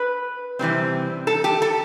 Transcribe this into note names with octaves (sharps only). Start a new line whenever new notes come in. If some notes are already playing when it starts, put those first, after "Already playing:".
Already playing: B4
C3 E3 G3 C4
A4
G4
A4